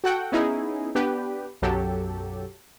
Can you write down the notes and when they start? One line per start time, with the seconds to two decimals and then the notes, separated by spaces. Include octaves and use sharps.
0.04 F#4 A4 F#5 G5
0.32 B3 C#4 D#4 E4 G#4
0.95 B3 D4 G4 B4
1.62 B1 F#2 F#3 G4 A4